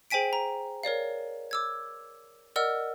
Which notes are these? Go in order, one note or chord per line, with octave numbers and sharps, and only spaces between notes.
G#4 C5 G5 G#5 B6 D7
A#5
A#4 C#5 D5 F5
D6 E6 G#6
A#4 D5 D#5 F#5 E6 F6